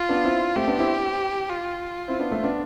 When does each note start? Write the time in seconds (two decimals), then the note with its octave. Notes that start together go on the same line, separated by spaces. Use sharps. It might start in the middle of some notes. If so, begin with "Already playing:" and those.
Already playing: F4
0.09 B3 D4
0.24 C4 E4
0.56 A3 C4 G4
0.67 B3 D4
0.79 C4 E4
1.50 F4
2.08 C4 E4
2.19 B3 D4
2.31 A3 C4
2.43 B3 D4